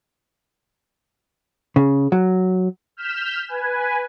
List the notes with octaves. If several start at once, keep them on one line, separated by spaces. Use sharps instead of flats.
C#3
F#3
F6 G6 B6 E7
B4 G#5